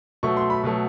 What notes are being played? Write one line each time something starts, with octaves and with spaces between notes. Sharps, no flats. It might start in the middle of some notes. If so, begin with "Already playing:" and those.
B2 F#3 A3 C#6
C6
B5
B2 F#3 A3